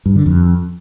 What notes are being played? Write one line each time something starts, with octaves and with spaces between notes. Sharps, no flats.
G2
D3
F2